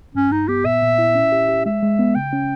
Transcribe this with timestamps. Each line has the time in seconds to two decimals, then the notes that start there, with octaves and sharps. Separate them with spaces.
0.15 G2 C#4
0.32 G2 D#4
0.48 B3 G4
0.65 A#2 E5
0.82 A#2
0.98 E4
1.15 C#4
1.32 G4
1.49 G4
1.66 G#3 E5
1.82 G#3
1.99 B3
2.15 C#3 G5
2.33 C#4